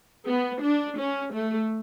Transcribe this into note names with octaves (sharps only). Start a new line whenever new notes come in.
B3
D4
C#4
A3